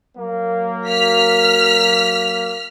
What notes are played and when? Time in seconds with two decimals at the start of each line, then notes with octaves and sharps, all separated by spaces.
0.17 F#3 A#3
0.89 F6 B6